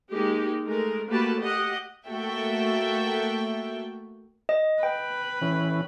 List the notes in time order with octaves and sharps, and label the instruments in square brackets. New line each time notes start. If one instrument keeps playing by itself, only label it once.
[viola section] G#3 A#3 D#4 G4
G#3 A3 A#4
A3 A#3 F#4 G4 B4 A5
G4 D#5 F#5
[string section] A3 A#3 F#4 A4 E5 G5
[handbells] D#5
[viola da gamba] B4 [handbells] G5
[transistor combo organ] E3 C#4